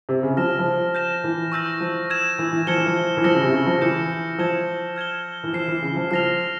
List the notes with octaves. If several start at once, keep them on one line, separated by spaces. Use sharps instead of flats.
C3
C#3
F3 F6 A#6 E7
F3
G6 A#6 E7
E3
C#6 E6 G6 A#6
F3
E6 G#6 E7
E3
E3
F3 F6 G#6 C#7 E7 G7
E3
F3
E3
F3 E6 A#6 C#7 G7
C#3
C3
C#3
F3
E3 G6 C#7 E7
F3 E6 G#6 E7 G7
F6 G#6 E7 G7
E3
F3 F6 C7 E7
E3
C#3
F3
F3 F6 A#6 F7